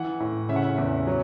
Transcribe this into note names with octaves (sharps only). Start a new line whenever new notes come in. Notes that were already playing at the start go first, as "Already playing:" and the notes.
Already playing: E3 F#5
A2
C#3 E5
F#5
E5
E2
F#3